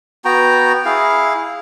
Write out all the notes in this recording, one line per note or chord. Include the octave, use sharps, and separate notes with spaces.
B3 F#4 G5 A#5
E4 G#4 F5